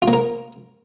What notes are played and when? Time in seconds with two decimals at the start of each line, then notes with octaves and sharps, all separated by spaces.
0.02 F4
0.08 A#3
0.13 A#4